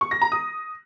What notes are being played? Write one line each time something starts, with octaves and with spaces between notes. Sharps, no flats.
C#6
A#6
A#5
D#6